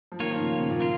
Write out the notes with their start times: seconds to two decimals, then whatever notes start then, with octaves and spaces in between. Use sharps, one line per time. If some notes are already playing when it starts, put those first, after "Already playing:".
0.12 F3
0.19 D#3 A#3 F4 C#5
0.30 F3
0.40 C#3
0.50 D#3
0.61 C#3
0.71 A#2
0.80 A#3 F4